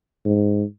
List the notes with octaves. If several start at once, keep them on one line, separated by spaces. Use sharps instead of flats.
G#2